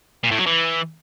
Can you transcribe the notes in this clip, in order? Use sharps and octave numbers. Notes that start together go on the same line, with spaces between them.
A#2
A2
F#3
E3